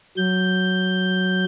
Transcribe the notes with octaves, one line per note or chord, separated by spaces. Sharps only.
F#3 G6